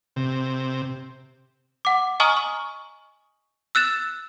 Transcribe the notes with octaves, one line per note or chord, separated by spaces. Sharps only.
C3
F#5 D6
D#5 G#5 A#5 C#6 D#6 F6
C#6
E6 F#6 A6 E7